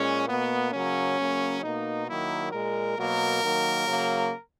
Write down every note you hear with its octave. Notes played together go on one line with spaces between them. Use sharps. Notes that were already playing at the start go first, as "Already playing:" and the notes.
Already playing: A#2 G#3 C#4
B2 A#3 B3
C#3 F#3 A#3 C#4
C#3 F#3 A#3
B2 A#3 D#4
D#3 F#3 A#3 E4
A#2 G#3 A#4
B2 F#3 A#3 A#4
D#3 F#3 A#3
C#3 F#3 A#3